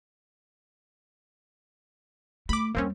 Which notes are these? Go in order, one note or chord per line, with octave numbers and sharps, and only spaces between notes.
A3 B5 D6
E2 G3 A#3 C4 C#4